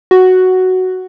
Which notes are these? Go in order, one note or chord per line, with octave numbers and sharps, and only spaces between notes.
F#4